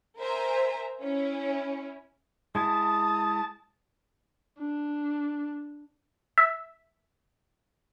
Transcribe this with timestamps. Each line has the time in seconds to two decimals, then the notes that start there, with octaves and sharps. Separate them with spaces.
0.19 A#4 C5 E5 G#5 A#5
1.03 C#4 E4
2.55 G#3 E4 G#5 A5 D#6
4.58 D4
6.38 E5